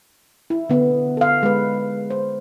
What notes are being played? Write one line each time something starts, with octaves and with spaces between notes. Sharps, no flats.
E4
D3 B3
A4 F5
G#3 B4
C5